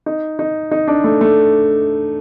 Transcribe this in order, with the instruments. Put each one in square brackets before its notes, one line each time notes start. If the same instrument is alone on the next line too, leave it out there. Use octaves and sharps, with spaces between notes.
[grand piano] D#4
D#4
D#4
D4
A3
A3